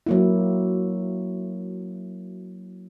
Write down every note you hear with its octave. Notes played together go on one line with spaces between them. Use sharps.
F#3 A#3 E4